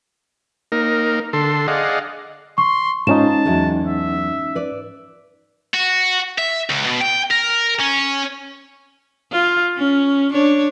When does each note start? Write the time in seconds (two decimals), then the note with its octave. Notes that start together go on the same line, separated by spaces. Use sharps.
0.72 A#3 D#4 A#4
1.33 D3 A4 C6
1.68 G#4 D5 D#5 F5 F#5
2.58 C6 C#6
3.07 G#2 C#4 D#4 F4 A5 E7
3.45 E2 F#3 G#3
3.87 E5
4.55 B4 D5
5.74 F#4
6.38 E5
6.70 C#2
6.85 B2
7.01 G5
7.31 A#4
7.80 C#4
9.31 F4
9.77 C#4
10.31 D4 C#5